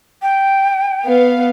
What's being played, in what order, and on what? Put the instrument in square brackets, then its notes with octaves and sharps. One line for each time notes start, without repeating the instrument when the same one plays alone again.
[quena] G5
[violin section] B3 F5